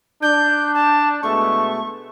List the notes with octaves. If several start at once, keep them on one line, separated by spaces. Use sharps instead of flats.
D4 G6
A5
B2 G#3 A3 C#6